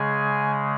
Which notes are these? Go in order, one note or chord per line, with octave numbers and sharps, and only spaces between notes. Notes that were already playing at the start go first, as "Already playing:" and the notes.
Already playing: C#3 G#3 G#5